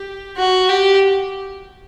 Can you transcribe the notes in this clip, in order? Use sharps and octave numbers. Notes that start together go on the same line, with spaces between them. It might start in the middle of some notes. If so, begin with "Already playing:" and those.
Already playing: G4
F#4
G4